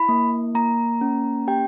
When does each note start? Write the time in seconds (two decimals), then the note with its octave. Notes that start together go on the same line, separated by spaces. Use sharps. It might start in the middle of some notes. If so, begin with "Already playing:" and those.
Already playing: E4 B5
0.09 A#3
0.55 A#3 A#5
1.01 C#4
1.47 G4 G5